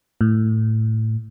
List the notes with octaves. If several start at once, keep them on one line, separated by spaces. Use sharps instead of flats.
A2